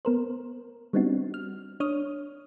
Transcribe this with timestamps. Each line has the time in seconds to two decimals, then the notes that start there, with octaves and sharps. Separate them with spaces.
0.05 B3 A#4 C5
0.93 G3 B3 C4 D4 D#4 F#4
1.34 F6
1.80 D4 C#5 D#6 F6